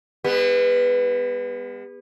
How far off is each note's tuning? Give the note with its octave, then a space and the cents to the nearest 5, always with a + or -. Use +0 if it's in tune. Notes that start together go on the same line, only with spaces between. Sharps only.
G#3 -45 B3 +0